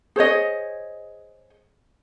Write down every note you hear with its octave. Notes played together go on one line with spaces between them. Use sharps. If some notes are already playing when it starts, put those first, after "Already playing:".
G#4 C5 C#5 D#5